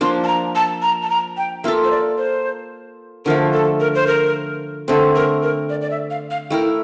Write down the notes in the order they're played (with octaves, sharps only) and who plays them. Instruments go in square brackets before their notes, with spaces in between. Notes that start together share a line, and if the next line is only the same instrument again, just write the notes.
[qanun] F3 A#3 D4 [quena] C6
[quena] A5
A#5
A5
A#5
A5
A#5
G5
[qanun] A#3 F4 A4 [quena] E5
[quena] C5
D5
C5
[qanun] D3 F3 A3 [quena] A#4
[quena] A4
A#4
C5
A#4
[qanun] D3 A3 C4 [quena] A4
[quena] A#4
A#4
D5
D5
E5
F5
F5
[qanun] A3 E4 A#4 [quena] G5